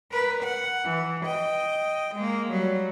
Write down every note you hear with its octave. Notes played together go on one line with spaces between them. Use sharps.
A#4 B4
F#5
E3
D#5 G5
G#3 A#3
F#3 G3